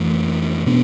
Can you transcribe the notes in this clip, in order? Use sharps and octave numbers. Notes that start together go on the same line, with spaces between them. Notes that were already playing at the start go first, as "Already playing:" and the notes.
Already playing: F2 E3 A3
B2 B3 D4